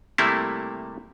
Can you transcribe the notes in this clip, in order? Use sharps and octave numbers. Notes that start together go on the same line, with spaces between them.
C3 G3 A3 A#3 E4